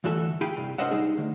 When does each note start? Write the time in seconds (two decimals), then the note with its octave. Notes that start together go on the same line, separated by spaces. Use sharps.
0.04 D2 G2 E3 F#4 A4 E5
0.41 E4 G#4 F5 G5 G#5 B5
0.57 C2 G2
0.78 D4 A#4 C5 D#5 E5 F#5
0.91 G3 D#4 G#4
1.18 D2